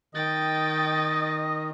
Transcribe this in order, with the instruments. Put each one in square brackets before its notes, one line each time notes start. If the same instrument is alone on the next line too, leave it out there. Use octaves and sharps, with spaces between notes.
[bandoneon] D#3 [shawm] D#5 [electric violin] G5 A6